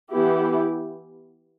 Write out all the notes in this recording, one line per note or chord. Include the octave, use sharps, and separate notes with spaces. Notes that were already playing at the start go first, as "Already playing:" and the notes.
E3 B3 E4 G4